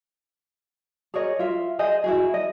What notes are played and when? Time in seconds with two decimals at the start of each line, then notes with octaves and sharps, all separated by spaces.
1.14 G#4 A#4 C#5 D#5
1.39 F4 E5
1.79 G#4 C5 D#5 G#5
2.04 E4 F#4 G#4
2.34 D#5